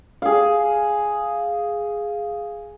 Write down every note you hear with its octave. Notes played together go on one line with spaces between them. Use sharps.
G#4 F5